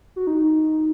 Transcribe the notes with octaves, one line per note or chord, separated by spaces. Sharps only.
F#4
D#4